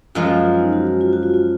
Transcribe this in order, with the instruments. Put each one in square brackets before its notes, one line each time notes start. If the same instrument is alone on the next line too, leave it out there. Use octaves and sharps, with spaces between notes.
[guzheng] F#2 F3 G#3 [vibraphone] F4
[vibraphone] F4
F4
D#4
F#4
F#4
F4
F#4
F4
F4